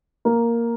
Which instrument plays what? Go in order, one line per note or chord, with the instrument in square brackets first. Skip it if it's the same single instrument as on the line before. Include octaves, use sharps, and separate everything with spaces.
[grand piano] A#3